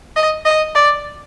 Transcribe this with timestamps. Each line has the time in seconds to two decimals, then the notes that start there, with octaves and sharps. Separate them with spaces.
0.16 D#5
0.45 D#5
0.75 D5